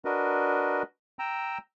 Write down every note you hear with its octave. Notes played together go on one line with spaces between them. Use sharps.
D4 F#4 A#4 B4 D#5
G5 A#5 E6